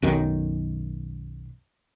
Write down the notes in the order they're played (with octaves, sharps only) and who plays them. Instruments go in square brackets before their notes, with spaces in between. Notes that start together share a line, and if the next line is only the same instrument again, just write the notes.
[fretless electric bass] B1 F#2 D#3